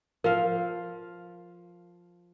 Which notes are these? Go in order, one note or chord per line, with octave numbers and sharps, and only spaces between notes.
F3 A#4 F5